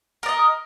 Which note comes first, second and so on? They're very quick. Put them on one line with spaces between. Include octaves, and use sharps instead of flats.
A#4 D5 D#5